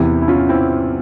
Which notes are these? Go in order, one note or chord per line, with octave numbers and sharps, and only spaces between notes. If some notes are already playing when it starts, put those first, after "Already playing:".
Already playing: E2 C3 E3 E4 G4
E4
C#4 F4
C4 E4